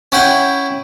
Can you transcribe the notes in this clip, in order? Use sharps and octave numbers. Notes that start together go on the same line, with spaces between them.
C#4 E4 F#5 G5